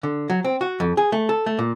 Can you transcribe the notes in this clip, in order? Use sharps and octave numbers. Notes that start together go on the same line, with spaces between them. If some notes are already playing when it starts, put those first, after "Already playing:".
D3
F#3
C4
F#4
F2
G#4
A3
A4
A3
A#2